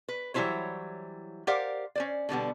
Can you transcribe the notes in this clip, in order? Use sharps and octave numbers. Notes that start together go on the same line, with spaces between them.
B4
E3 F#3 G3 E4 C5 C#5
G4 A#4 C5 D5 F5 F#5
C#4 C5 D5
B2 D3 G3 B3